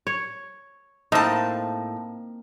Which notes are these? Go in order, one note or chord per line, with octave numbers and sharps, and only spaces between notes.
C#5
A2 A#3 C4 D#4 A5